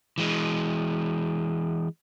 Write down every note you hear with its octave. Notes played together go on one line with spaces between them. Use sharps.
E3 G#3